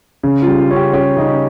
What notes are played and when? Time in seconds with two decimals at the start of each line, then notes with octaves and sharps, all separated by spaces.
0.23 C#3
0.42 F4
0.47 G3
0.59 F4
0.71 C#4
0.76 G4
0.93 C#4 G4
1.17 C#3 D#4
1.28 C#4